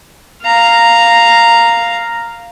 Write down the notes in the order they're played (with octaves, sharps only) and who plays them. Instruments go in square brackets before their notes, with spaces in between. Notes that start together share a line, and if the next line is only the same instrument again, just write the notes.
[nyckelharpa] F5 A#5